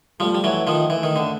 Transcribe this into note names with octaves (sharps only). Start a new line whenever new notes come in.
F3 G3 A3
G3
E3 F#3
D#3 F3
E3 A3
D#3
D3